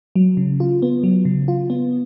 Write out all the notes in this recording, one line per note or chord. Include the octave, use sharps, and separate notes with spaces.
F#3
C#3
F4
B3
F#3
C#3
F4
B3